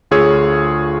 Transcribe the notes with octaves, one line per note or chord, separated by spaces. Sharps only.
D2 F4 G#4 C#5 E6